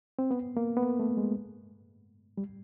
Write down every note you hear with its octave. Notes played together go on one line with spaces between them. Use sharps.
C4
B3
A#3
B3
A#3
A3
G#3
G3